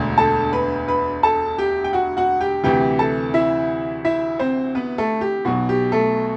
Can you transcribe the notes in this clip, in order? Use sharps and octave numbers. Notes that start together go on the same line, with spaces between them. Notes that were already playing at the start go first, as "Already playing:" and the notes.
Already playing: E1 D2 D3
A4 A5
B4 B5
B4 B5
A4 A5
G4 G5
G5
F#4 F#5
F#4 F#5
G4 G5
D2 C3 E3 G4 G5
A4 A5
E4 E5
E4 E5
C4 C5
B3 B4
A3 A4
G4
B1 B2 F#4
G4
A3 A4